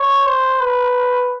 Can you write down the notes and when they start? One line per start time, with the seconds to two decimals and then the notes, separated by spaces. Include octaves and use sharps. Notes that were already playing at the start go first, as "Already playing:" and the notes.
Already playing: C#5
0.26 C5
0.61 B4